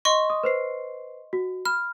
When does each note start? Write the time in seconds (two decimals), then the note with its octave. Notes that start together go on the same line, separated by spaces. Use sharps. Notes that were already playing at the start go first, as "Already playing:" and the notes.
0.05 D#5 C6 C#6
0.30 D#6
0.44 B4 C5 C7
1.33 F#4
1.65 B5 F6